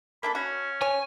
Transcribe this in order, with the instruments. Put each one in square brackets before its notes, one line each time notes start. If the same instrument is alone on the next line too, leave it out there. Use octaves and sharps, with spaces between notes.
[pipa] A#3 D4 A4 [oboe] B5
[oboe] C#4 [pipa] F#4
[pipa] C#5 [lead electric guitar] G#5